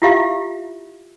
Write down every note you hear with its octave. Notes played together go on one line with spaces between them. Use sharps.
E4 F4 G4 E5 F5